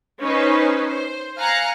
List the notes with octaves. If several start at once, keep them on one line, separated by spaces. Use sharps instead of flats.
C#4 D#4 B4 C5
C5
F5 G#5 A#5 F#6 C#7